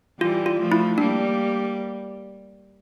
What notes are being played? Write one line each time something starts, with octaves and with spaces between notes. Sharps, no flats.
E3 G3 F4
F4
F3 A3
E4
G3 A#3 D4